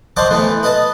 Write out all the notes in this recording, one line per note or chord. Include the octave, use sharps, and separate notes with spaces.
C5 D#5 F#5 A5 C#6 D6
E3 A3 B3
B4 D#5 A5